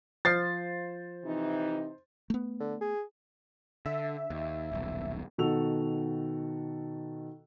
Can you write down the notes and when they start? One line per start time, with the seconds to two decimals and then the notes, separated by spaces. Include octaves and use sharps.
0.25 F3 C5 A6 C7
1.24 C3 E3 D#4
2.30 A3 B3
2.60 D3
2.81 G#4
3.86 D3 E5
4.30 D#2
4.72 D#1 B1
5.38 B2 D#3 F#4 A4 E6 F7